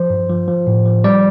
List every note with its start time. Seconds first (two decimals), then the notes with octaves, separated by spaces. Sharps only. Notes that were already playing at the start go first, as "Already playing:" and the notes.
Already playing: F3 C5
0.10 G2
0.30 F3
0.48 F3
0.67 A2
0.86 F3
1.04 G3 D5